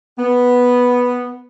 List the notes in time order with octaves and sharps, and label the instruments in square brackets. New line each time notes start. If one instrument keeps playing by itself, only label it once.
[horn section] B3